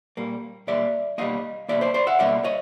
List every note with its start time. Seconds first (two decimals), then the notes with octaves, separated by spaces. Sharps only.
0.17 A#2 G3 A#3
0.67 A#2 G3 A#3 D5 E5
1.18 B2 G3 A#3 D#5 F5
1.69 B2 G3 A#3 D5 E5
1.81 C5 D5
1.94 C5 D5
2.07 E5 F#5
2.19 B2 G3 A#3 D5 E5
2.44 C#5 D#5